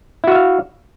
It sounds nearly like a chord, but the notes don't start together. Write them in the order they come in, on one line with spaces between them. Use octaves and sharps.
E4 F#4 E5 F5